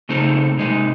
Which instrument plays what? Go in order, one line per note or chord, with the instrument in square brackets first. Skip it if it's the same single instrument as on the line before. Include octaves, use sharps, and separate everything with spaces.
[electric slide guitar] C#3 A3 C4 D#4 A4
C3 G#3 D#4